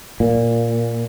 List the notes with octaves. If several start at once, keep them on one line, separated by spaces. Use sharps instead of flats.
A#2